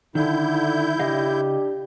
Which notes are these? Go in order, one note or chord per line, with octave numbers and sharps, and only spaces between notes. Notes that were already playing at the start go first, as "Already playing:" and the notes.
D3 D#3 E4 G6
C#3 D4 G4 D#5 F5